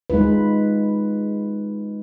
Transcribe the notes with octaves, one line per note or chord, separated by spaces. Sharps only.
G#3 D#4 F4 B4